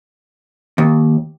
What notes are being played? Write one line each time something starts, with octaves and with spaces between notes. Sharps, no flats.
D#2